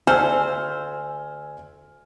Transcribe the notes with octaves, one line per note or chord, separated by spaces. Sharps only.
D2 G#4 A4 C5 G#5 E6 F6